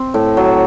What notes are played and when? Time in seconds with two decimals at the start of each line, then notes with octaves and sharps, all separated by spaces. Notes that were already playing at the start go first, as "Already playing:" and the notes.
Already playing: C4
0.14 A2
0.37 F#3